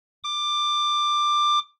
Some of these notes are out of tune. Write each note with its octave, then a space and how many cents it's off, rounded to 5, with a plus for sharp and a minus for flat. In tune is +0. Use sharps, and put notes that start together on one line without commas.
D6 +15